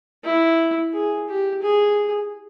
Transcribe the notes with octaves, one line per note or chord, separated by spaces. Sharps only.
E4
G#4
G4
G#4